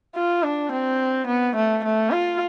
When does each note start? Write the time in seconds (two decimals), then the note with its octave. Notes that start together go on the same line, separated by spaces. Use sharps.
0.16 F4
0.43 D4
0.72 C4
1.27 B3
1.56 A3
1.84 A3
2.11 F4